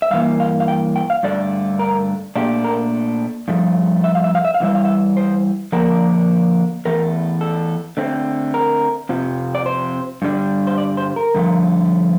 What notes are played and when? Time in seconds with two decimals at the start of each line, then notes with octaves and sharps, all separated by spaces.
0.02 E5
0.11 G2 E3 A#3 F5
0.40 F5
0.60 F5
0.68 G5
0.96 G5
1.10 F5
1.23 G2 D3 A3 D4 D5
1.79 A#4
2.36 A#2 A3 D4 G4
2.64 A#4
3.48 G2 F3 A3
4.04 E5
4.15 F5
4.24 E5
4.35 F5
4.45 E5
4.54 F5
4.60 E2 E3 G3 E5
4.75 F5
4.85 E5
5.17 C5
5.72 D3 F3 A#3 D4 A#4
6.85 E2 E3 A3 A#4
7.41 A4
7.97 D3 A3 C4
8.54 A#4
9.09 F2 C3 F3
9.55 D5
9.66 C5
10.22 G2 D3 G3 D4
10.67 C5
10.78 D5
10.97 C5
11.16 A#4
11.34 G2 D3 F3 A3